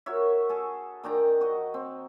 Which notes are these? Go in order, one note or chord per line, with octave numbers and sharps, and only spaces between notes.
F#4 A#4 C#5 E5
G#4 A4
D#3 D4 G5 A#5
F#4 D#5
C4